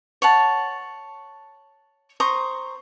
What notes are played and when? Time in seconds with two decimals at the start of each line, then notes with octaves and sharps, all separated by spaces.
0.22 C#5 F#5 A5
2.20 C5 A#5 C#6 D#6